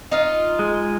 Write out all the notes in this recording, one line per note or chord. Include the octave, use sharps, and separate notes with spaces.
D#4 F4
G#3